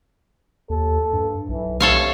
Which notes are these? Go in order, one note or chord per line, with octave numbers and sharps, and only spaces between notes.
D#2 A4
G2
B1 E3
C3 A4 C#5 F5